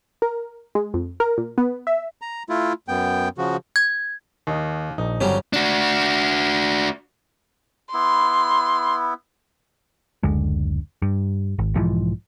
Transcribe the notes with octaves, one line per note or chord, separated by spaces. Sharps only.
A#4
G#3
F2
A#4
A#2
B3
E5
A#5
A3 E4 F4
F#2 B3 G5
C#3 F3 F#4
G#6
D#2 D#3 D#5
A#1 D#4
G1 F2 F#3 G3 C#4
D4 F#4
B3 E4 C6
F#1 D2 D3 G#3
G2
G#1
B1 G#2 E3 F3